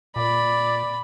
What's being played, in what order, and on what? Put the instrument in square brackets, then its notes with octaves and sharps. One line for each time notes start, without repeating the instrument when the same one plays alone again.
[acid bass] A#2 [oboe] D5 [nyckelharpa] B5